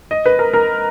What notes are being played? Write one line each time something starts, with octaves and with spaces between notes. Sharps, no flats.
D#5
B4
A#4
A#4